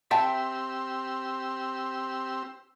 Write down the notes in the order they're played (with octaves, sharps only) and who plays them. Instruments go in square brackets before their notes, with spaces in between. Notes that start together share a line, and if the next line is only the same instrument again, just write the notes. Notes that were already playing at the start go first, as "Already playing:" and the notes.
[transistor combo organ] C4 G4 E6 [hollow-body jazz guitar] E5 G5 A5